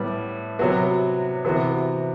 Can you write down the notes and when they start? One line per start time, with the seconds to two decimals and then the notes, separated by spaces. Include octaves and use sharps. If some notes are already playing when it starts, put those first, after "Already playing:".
Already playing: A2 G3 B3
0.59 C3 F#3 B3 F#4
1.44 C3 E3 B3 F#4